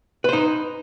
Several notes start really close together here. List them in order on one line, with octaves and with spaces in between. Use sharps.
B4 C5 D#4